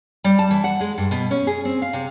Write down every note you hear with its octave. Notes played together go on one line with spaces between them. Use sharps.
G3
A5
E3
F#5
G#3
G2
B2
C#4
G#4
C4
F5
C3